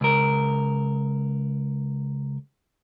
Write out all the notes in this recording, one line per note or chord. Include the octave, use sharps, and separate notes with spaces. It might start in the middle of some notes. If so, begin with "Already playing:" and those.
C#2 A#4